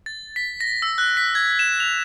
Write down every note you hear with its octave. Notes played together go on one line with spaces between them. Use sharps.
A6
B6
A#6
E6
F#6
B6
G#6
E7
F7